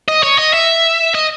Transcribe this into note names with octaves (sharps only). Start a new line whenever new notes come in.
D#5
C#5
D#5
E5
D#5